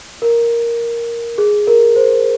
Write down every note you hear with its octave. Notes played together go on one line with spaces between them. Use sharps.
A#4
G#4
A#4
C5